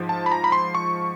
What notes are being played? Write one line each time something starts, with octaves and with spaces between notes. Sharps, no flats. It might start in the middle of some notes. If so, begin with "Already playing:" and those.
Already playing: G#2 F3
A5
B5
A#5
B5
C6
C#6